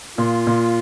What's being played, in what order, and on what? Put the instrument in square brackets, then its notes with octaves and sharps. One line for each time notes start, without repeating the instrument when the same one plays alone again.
[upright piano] A#2 [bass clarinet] F4
[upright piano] A#2